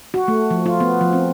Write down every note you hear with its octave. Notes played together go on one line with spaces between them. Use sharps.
F#4
A3
F3
F4
B3
F3
C4